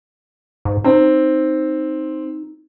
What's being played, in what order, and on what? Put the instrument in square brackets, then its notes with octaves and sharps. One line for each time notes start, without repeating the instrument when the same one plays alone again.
[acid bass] G#2
[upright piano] C4 [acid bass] D#4